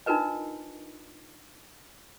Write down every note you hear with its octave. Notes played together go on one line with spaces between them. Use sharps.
D4 D#4 F4 A#4 B4 D#5